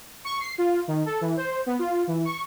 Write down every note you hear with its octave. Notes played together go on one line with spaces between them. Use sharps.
C#6
C7
F4
D#3
A4
E3
C5
B3
F4
E3
C#6